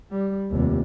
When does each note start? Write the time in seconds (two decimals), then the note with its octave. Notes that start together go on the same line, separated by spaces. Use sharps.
0.11 G3
0.50 F1 D#2